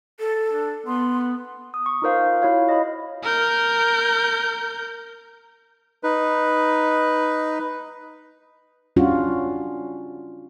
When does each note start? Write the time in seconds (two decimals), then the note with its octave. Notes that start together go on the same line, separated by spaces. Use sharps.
0.20 A4
0.49 D4
0.87 B3 C6
1.74 D#6
1.86 C#6
2.02 D#4 F4 A#4 C5 F5
2.26 F4
2.42 E4 F#4 C#5 F5
2.69 D#5 B5
3.23 A#4 G6
6.03 D#4 B4
8.96 G3 C#4 D4 F4 F#4